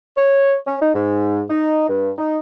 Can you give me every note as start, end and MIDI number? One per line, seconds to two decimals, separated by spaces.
0.17 0.56 73
0.67 0.76 61
0.81 0.90 63
0.94 1.42 44
1.49 1.87 63
1.88 2.11 43
2.18 2.38 63